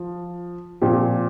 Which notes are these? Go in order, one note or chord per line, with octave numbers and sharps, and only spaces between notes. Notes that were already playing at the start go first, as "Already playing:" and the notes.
Already playing: F3
A#2 F3 C4 G4